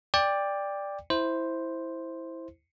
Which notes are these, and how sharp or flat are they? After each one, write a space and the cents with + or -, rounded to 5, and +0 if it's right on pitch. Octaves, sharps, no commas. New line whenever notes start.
D5 +0 G5 +20
E4 -5 C5 +0